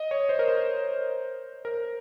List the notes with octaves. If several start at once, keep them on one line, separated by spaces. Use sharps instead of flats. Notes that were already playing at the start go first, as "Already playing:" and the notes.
Already playing: D#5
C#5
C5
A#4
C5
A#4